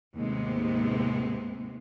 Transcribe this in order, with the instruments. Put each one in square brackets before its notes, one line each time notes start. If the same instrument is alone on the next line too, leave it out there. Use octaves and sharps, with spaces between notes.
[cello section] D#2 A2 C3 G#3 B3 C4